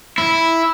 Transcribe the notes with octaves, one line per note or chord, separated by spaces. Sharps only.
E4